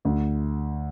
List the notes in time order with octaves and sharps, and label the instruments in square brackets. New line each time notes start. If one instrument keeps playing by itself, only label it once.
[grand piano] D2